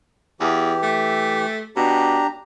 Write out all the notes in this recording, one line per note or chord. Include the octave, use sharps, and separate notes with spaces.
E2 E3 G4
A3
B2 D4 G4 A#5